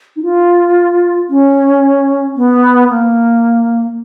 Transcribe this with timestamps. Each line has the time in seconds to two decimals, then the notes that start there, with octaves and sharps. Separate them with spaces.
0.16 D#4
0.23 F4
1.30 C#4
2.36 B3
2.90 A#3